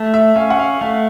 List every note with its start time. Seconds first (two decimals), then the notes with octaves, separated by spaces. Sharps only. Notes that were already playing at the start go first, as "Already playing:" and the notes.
Already playing: A3
0.14 E5
0.36 C#4 F5
0.50 F#5
0.59 F5
0.81 A3 F5